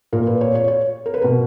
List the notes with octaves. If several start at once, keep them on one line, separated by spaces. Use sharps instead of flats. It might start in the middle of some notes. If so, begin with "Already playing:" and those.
A#2 A#4
B4
C#5
C#5
C#5
A#4
B4
B2 A#4